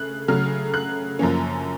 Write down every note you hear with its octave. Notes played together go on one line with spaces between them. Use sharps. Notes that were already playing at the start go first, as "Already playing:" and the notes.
Already playing: C#3 A3 F#6
C#3 F#3 A3 F6
F#6
F#2 F3 A#3 C#4